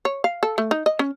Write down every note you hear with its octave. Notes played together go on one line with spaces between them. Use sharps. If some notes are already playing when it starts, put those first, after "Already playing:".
C#5
F5
A4
A3
D#4
D#5
C#4